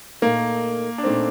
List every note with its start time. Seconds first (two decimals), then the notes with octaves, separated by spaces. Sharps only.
0.22 A#2 A3 A#3 D#4 A#4
0.98 D4
1.04 A#2 A3 C4 D#4 A#4